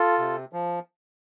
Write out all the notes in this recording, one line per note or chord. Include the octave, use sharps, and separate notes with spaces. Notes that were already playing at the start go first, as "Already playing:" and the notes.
Already playing: F4 A4
C3
F3